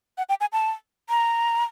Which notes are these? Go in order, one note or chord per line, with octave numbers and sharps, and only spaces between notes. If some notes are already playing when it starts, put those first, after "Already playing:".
F#5
G5
G#5
A5
A#5